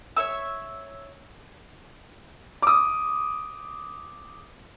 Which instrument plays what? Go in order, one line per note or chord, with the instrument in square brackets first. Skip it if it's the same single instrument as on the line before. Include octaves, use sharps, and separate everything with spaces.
[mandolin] C#5 E5 E6
[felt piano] D6 D#6